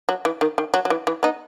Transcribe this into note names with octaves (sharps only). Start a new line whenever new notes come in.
F#3
E3
D#3
D#3
F#3
F#3
E3
E3
B3 D#4